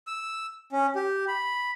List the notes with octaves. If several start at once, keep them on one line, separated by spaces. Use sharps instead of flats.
E6
C#4
G4
B5